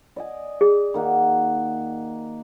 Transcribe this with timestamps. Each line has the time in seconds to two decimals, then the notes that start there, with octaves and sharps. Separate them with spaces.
0.16 D5 D#5 G#5
0.61 G#4
0.94 D#3 A#3 F#4